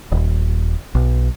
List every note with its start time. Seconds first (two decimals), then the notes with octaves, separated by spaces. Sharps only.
0.12 D#1
0.95 B1